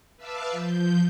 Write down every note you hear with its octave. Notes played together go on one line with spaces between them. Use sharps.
B4 E5 F5 A5 D6 E6
F3 G6